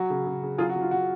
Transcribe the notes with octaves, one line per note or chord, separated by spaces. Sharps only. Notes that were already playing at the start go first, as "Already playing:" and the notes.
Already playing: F#3 F#4
C#3
C#3
C#3
F#3 F4 G#4
F#4
F#3
F4
F#3 F#4